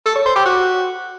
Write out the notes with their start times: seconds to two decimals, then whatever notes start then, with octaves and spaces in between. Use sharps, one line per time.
0.06 A4
0.16 C#5
0.26 C5
0.36 G4
0.45 F#4